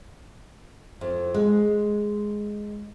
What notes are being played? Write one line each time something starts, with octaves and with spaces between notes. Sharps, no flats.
F2
G#3